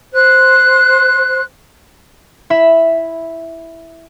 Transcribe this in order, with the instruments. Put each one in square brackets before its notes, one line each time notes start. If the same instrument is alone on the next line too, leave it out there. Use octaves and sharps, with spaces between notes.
[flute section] C5 F#6
[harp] E4 E5 B5